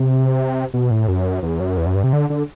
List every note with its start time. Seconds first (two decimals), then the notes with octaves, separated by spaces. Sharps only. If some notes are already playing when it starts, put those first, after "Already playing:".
Already playing: C3
0.74 B2
0.91 A2
1.08 F#2
1.43 E2
1.60 F#2
1.78 E2
1.86 F#2
1.95 G2
2.04 C3
2.13 D3
2.30 D3